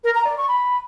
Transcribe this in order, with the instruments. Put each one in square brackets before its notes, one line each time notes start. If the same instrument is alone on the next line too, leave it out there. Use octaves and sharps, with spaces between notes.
[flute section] A#4
A#5
D5
C#6
B5